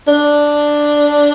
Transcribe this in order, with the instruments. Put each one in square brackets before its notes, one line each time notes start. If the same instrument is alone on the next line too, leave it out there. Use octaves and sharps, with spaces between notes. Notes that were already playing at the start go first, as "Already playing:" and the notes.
[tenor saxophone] D4